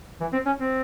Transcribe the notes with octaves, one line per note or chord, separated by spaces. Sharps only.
E3
C4
C#4
C4